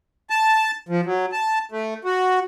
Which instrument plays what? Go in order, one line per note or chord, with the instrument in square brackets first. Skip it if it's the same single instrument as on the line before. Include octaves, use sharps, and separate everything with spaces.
[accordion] A5
F3
F#3
A5
A3
F#4